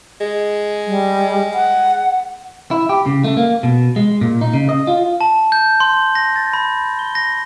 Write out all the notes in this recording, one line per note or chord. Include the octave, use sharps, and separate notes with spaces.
G#3
G3
F#5
E4
G4
C#3
A3
A#3
B2
G#3
A#2
D#4
C#3
D#5
F4
A5
G6
C6
A#6
A6
B5
G7
A#6